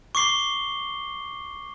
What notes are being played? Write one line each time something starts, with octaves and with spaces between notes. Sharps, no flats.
C#6 D6 C7 G7